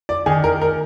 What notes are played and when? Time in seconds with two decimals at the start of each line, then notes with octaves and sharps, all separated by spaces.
0.09 D5
0.26 D#3 G#4
0.44 A#4
0.62 A#4